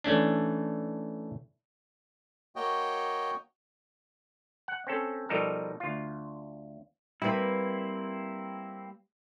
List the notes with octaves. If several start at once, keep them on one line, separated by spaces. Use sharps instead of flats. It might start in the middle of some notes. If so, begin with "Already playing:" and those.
E3 A3 C#4 D4
A#3 F#4 C#5 D#5 G5
F#5
C4 C#4 A4
B2 F3 G3 D#4 A4 A#4
D2 F4
G3 A#3 C4 E4 B4